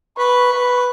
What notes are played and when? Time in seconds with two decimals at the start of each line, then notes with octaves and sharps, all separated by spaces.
0.18 B4 C#6
0.52 B4